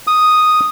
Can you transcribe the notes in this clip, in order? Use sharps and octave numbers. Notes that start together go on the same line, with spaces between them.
D#6